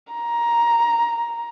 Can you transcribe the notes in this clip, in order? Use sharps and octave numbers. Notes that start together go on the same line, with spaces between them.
A#5